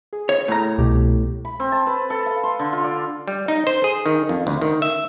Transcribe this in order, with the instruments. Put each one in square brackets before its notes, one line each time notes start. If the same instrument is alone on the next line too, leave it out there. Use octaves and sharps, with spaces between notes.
[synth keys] G#4
[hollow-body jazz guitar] C#5
A2 A#5
[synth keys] C2 B2 G4
[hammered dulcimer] B5
C4
A5
B4
A4
F5
C6
D3
F4
D5
[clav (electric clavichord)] G3
D#4
C5
G#4
D#3
F2
D2
D#3
E5